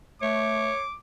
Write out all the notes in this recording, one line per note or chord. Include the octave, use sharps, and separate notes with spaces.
A3 C#5 D6